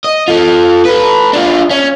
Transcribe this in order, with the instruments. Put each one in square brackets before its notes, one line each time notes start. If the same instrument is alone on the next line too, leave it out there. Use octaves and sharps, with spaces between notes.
[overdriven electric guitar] D#5
F4 A4
A4 B4
D4 F4
C#4